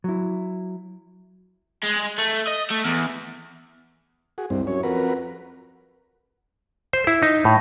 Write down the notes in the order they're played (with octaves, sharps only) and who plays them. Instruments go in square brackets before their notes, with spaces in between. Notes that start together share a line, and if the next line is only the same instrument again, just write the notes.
[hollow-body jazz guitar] F#3 E4
[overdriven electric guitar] G#3
A3
D#5
A3
E2
[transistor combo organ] F#4 G#4
[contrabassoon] C2 [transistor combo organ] G2 C4
[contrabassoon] F#2 [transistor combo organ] C#5
[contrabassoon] F2 [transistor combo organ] F#4 A#4 B4
[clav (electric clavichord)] C5
E4
D#4
A2